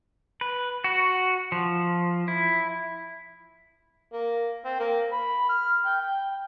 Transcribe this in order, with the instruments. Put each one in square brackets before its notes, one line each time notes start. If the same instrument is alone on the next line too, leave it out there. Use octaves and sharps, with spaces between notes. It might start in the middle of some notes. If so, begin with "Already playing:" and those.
[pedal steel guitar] B4
F#4
F3
E4
[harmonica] A#3
C4
A#3
B5
F6
G5
G5